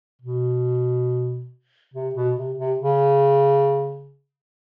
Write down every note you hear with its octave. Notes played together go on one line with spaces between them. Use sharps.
B2
C3
B2
C3
C3
C#3